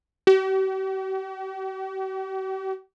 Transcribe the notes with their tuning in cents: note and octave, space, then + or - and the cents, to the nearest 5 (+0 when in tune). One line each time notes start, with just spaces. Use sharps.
G4 -45